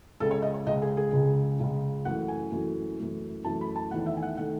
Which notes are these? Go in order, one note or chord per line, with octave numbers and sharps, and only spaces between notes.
C#2 C#3 G#3 A4
C#5
D#5
C#5
C#2 C#3 G#3 D#5
G#4
G#4
C#2 C#3 G#3
C#2 C#3 G#3
F#2 E3 A3 F#5
G#5
F#2 E3 A3
F#2 E3 A3
F#2 E3 A3 A5
B5
A5
E2 D#3 A3 F#5
E5
G#5
F#5
D#3 A3 F#5